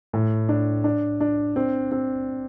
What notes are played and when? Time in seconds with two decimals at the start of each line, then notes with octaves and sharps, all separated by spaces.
0.13 A2
0.49 D4
0.84 D4
1.21 D4
1.56 C4
1.92 C4